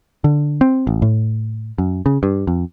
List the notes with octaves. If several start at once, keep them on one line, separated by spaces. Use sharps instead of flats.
D3
C4
A1
A2
F#2
C#3
G2
F2